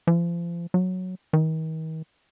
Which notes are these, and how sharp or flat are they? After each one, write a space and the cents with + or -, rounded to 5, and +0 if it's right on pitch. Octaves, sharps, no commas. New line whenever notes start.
F3 -35
F#3 -5
D#3 +40